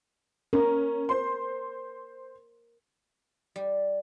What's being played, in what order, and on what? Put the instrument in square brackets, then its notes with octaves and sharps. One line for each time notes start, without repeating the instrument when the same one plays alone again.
[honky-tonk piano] C#4 [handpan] A#4
[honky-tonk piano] C5 C6
[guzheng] G3